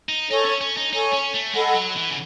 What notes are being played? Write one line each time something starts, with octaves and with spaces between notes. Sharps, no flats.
D#4
D#4 A4 C#5 G#5 C#6
C#4
C#4
D#4
D#4 A4 C#5 G#5 C#6
C#4
A3
G#3 A4 D#5 F#5 B5
F#3
E3
C#3